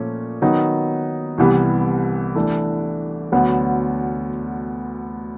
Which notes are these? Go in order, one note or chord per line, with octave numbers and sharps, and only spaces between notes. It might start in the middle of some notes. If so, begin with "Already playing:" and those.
Already playing: A#2 F3 A3 C#4
D#3 F#3 B3 D#4
C2 C3 E3 G3 B3
E3 A3 D4
D2 D3 F#3 B3